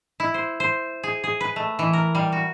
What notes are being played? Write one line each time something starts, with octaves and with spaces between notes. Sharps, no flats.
E4
C5
C5
G#4
G#4
B4
A3
E3
A#4
G3
F#4